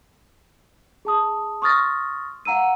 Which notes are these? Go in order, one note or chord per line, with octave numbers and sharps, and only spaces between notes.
G#4 A5 D#6
C6 C#6 D#6 F6 A6 A#6
F5 F#5 A#5 E6 D#7